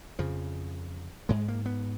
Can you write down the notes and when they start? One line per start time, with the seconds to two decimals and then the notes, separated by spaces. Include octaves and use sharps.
0.19 F2 C#3 F3
1.29 G#2 G#3
1.48 A#3
1.66 B3